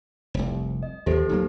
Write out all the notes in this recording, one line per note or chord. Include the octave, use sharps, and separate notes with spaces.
F1 C2
D#5
D#2 F3 G4 A4 C5
D#1 F#3 A#3 D#4